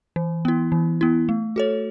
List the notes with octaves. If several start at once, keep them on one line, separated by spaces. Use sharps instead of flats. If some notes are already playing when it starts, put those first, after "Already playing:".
E3
B3 E4
E3
B3 E4
A3
F#4 A4 C#5